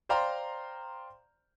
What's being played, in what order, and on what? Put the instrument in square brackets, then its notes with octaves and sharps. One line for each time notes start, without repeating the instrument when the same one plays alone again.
[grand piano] C5 D5 F5 G5 A#5 C6